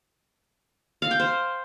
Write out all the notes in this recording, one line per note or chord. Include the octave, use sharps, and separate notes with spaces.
F5
G5
C5